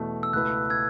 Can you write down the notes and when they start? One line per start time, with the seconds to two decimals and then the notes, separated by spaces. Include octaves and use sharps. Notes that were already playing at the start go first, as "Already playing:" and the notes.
Already playing: E2 B2 A3
0.23 E6
0.33 C#2 B2 A3 E4 B4 F#6
0.70 E6 G#6